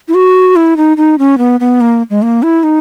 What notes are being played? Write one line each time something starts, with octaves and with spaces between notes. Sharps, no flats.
E4
F#4
E4
D#4
D#4
C#4
B3
B3
A#3
G#3
A#3
E4
D#4